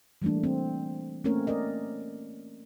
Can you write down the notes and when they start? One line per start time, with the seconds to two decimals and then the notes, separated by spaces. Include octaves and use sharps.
0.22 E3 G3 A3 A#3 D4
0.44 C4
1.24 A3 A#3 C4 C#4 A#4 C#5
1.47 A#4 D5 D#5